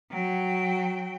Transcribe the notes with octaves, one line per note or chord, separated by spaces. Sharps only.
F#3 G5